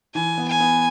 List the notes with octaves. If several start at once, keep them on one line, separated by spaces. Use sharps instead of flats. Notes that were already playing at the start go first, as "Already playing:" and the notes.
E3 G#5
B3
G#5
B3